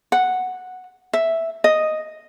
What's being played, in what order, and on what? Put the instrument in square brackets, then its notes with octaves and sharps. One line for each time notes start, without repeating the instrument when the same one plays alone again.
[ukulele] F#5
E5
D#5